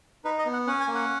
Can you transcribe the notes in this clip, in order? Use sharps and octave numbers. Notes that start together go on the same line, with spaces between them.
D#4 B4
D#5
B3
F#5
C#4 F#5
G#5
A#3
F#5